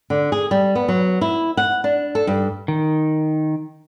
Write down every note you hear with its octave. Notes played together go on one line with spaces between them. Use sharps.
D3
G#4
G3
B3
F#3
E4
F#5
D4
A4
G2
D#3